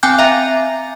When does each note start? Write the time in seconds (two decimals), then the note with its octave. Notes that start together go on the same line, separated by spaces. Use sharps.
0.03 C4 G5 G#5 D6 F#6 G6
0.19 E5 F5 A#5